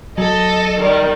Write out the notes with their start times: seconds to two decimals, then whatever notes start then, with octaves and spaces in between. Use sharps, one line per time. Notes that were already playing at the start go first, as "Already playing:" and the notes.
0.18 F#3 A4 D#5
0.77 D#3 G3